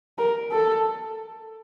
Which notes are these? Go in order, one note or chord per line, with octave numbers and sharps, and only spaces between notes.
A#4
A4